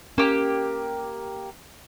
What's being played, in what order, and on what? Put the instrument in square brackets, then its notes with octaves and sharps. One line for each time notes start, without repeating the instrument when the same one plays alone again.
[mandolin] A#3 G4 [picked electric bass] C#4